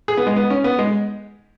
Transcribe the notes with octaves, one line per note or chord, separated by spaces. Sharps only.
G#4
B3
G#3
B3
C#4
B3
G#3